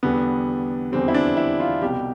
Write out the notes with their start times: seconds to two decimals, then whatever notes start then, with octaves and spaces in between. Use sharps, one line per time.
0.03 E2 D3 G3 B3
0.92 E2 D3 G3 C4
1.08 E4
1.14 D4
1.37 E4
1.60 F4
1.82 C2 B2 G3 G4